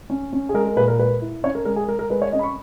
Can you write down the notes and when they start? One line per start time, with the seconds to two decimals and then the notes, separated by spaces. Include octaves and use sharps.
0.10 C#4
0.33 C#4
0.49 G#4
0.54 G#3 A#4
0.66 A#4
0.76 A#2 B4
0.88 A#4
0.98 G#3 B4
1.22 E4
1.43 C#4 C#5
1.55 A#4
1.65 G#3 A#4
1.76 G#4
1.88 G#3 A#4
1.99 A#4
2.10 G#3 B4
2.22 C#5
2.32 C#4 D#5
2.39 B5
2.43 C#6